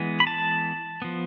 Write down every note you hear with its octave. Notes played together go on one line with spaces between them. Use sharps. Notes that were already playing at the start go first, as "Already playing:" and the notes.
Already playing: E3 G#3 B3 G#5
B5
A5
F3 B3